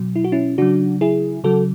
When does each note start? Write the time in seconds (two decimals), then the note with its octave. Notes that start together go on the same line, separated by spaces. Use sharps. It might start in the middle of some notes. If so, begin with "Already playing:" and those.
Already playing: B2 F#3
0.16 E4
0.24 F#4
0.32 C#4 E4
0.58 C#3 F#3 D4 F#4
1.01 E4 G#4
1.44 C#3 F#3 F#4 A4